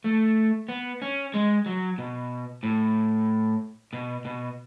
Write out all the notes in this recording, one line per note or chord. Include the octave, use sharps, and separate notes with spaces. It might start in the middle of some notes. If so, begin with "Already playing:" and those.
A3
B3
C#4
G#3
F#3
B2
A2
B2
B2